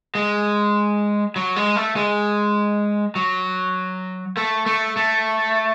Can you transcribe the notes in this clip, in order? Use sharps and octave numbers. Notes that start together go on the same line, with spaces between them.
G#3
F#3
G#3
A3
G#3
F#3
A3
A3
A3